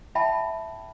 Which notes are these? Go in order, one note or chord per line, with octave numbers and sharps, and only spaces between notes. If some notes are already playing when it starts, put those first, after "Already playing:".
E5 G5 A5 B5